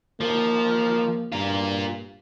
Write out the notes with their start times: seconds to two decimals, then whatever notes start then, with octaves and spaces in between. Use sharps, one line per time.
0.21 F3 A#3
1.32 G2 A#3 F4